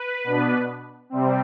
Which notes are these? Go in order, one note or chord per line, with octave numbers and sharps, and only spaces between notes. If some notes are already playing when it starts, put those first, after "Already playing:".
Already playing: B4
B2 B3 D4
C3 G3 C4